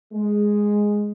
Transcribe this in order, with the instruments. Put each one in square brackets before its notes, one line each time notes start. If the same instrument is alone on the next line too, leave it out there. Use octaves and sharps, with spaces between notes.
[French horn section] G#3